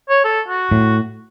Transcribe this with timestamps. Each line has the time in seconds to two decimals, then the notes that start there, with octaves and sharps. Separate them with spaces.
0.09 C#5
0.24 A4
0.48 F#4
0.71 A2